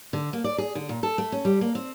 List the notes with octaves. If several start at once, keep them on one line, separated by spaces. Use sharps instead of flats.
D3
A#3
D5
G#4
D3
A#2
A4
A3
C#4
G3
A#3
C4